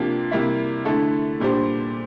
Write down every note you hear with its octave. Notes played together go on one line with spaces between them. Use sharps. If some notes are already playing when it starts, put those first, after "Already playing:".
Already playing: C3 F3 A#3 D4 G4
C3 G3 A#3 E4
D3 A3 E4 A4
A#2 G3 D4 G4 C5